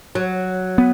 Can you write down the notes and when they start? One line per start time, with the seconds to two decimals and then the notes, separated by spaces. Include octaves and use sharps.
0.15 F#3
0.78 B3